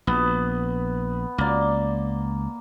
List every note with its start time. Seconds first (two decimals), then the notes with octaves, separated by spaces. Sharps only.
0.07 A#1 B3
1.38 C#2 A#3 D5